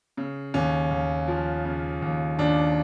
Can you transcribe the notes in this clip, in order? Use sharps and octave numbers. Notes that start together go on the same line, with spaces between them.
C#3
D#2 C#4
D#2
F3
C#3
D#2
D#2 D4